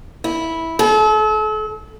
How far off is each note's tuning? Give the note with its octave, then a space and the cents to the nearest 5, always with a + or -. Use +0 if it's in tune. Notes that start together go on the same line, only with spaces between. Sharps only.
E4 -10
A4 -40